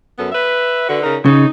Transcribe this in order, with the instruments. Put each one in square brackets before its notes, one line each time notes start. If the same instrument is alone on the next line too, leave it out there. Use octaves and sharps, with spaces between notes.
[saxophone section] F#2 B3 A4
B4 E5
D3 F#4 B4
C#3 D#4 A#4
[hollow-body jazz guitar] C#3 [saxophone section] D#4